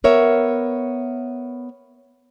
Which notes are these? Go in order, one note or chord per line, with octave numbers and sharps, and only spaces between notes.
B3 A#4 C#5 E5